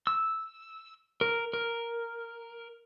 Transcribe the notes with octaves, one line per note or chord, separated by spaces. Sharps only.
E6
A#4
A#4